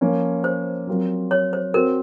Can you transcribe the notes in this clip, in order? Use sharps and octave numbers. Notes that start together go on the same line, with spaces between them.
F3 A#3 C#4
C5
F#3 C4 F4 A#4
C#5
C5
C4 F#4 A#4 C5